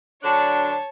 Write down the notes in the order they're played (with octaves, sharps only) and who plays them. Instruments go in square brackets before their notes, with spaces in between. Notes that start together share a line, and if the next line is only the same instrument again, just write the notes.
[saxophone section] D3 F#3 D4 [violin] C#5 A5